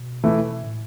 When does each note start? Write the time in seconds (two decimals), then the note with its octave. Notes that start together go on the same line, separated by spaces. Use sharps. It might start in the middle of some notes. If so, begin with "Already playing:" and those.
Already playing: B2
0.24 E3 A3 E4
0.64 A2